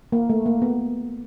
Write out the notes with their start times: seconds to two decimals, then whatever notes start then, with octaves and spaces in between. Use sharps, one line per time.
0.12 A#3
0.30 A3
0.46 A#3
0.62 B3